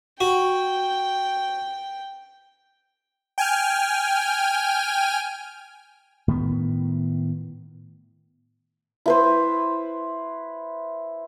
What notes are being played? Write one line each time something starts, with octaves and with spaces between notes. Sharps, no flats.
F#4 G5
G5 G#5 F6
A2 D#3 B3
E4 B4 C5